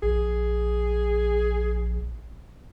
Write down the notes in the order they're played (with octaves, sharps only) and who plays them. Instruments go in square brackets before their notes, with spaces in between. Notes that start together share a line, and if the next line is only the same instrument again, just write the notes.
[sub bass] A#1 [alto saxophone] G#4